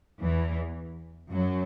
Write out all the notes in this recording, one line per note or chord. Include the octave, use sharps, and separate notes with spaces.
E2 E3
F#2 F#3